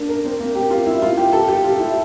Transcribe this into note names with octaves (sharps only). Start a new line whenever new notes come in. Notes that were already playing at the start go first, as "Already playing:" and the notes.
Already playing: A#3 D4
A#4
C4
A#3
G4
F4
E4
F4
G4
A4
G4
F4
E4